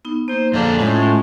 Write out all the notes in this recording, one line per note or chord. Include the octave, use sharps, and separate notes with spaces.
B3 D#4
A#3 D#4 C5
F2 A#3 D4 G#4 A4 F5 A#5
A2 G#3 C#4 F4 A5